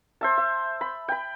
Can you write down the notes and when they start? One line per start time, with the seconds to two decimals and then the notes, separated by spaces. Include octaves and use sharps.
0.21 C5 E5 A5
0.38 E5
0.81 B5
1.08 G5 B5